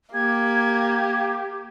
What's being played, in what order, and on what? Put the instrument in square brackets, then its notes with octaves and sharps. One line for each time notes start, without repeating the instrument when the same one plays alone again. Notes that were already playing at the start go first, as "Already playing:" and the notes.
[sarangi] A#3 [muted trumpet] G4 [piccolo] G#6